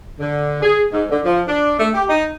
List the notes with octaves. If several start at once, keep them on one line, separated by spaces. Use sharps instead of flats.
D3
G#4
G#2
D3
F3
D4
A3
G4
D#4